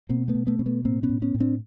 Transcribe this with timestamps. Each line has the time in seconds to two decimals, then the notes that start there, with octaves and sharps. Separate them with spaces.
0.09 B2 A#3 C4
0.28 A3 B3
0.35 B2
0.47 A3 B3
0.59 B2 C4
0.66 A3 B3
0.85 A2 A#3 C4
1.03 B3 C#4
1.09 A2
1.22 B3 C#4
1.34 A2
1.40 C4 D4